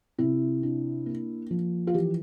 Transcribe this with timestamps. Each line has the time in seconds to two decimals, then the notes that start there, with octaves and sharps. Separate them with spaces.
0.18 C3 E4
0.63 D4
1.06 A#3
1.51 F3
1.87 F4
1.94 E3 G4